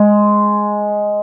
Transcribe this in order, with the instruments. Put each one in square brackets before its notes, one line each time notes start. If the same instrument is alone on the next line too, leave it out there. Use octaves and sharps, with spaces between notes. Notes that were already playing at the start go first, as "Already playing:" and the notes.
Already playing: [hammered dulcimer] G#3